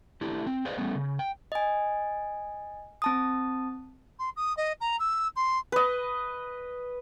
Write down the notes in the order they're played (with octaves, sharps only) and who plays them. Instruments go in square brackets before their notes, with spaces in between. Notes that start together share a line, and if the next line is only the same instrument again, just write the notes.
[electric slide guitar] A3 D4 E4 G4
C4
G#4 B4 C5 D5 D#5 F5
G3 A3 B3 C#4
C#3
G5
[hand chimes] D#5 G#5
C4 A5 D#6
[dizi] C6
D#6
D#5
A#5
E6
C6
[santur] B4 D#5